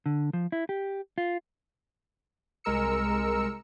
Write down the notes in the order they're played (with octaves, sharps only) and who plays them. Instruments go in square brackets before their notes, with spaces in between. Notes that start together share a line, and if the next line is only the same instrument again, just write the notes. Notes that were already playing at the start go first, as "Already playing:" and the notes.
[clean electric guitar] D3
F3
E4
G4
F4
[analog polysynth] C2 G#3 A#4 E6 C#7